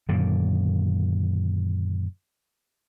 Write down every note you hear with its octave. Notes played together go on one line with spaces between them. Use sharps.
F#2 A#2 D3 D#3